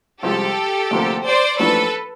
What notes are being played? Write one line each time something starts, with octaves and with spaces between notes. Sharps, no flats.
C2 C3 F3 G#3 G4 A4
D2 C3 F3 A#3
C5 D5
A1 A2 F3 A#3 D4 A4 B4